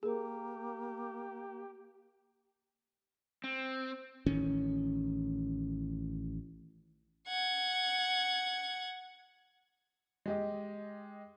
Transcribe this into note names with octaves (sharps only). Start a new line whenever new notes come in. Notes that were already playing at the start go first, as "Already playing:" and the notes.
A#3 G4 G#4 A#4
C4
A1 D#3 C#4
F#5 G#6
G#3 G4 D#5